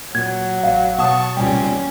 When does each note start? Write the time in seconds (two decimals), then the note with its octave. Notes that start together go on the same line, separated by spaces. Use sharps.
0.15 A#2 F#3 G#6
0.63 A1 F5
0.99 B2 F#5 A5 C#6 D#6
1.37 C2 A#2 G3 C#4 G5